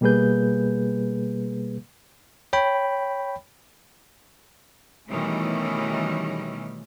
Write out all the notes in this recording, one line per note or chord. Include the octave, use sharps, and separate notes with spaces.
B2 G3 A#3 G#4 B4 G6
C#5 G5 B5
B2 D#3 E3 G3 A3 C#4